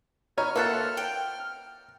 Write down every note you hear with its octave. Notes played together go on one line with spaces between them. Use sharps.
B3 D#4 C#5 D#5 F6
A#3 F4 A4 C5 E5 F#5 A5
G5